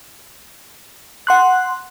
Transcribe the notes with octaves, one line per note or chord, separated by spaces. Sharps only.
F#5 C6 F#6